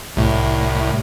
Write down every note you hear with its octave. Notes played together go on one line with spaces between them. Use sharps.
C2 A2